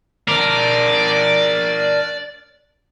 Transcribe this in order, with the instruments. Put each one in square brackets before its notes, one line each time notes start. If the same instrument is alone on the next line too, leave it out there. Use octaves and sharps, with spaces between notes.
[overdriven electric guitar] D4 A#4 [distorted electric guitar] D5